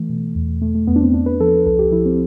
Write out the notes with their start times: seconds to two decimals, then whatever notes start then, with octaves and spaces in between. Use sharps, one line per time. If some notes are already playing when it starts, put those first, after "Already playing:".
Already playing: E3 A3
0.09 B2
0.35 E2
0.61 B2 A3
0.75 A3
0.87 E2 B3
0.96 D4
1.01 C4
1.13 E2 D4
1.26 B4
1.40 F3 A4
1.66 C2 A4
1.79 G4
1.92 F3 E4
2.06 C4